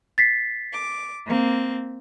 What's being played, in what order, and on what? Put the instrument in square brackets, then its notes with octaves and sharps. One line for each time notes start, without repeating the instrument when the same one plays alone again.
[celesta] A6 B6 C7
[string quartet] D6
A#3 C4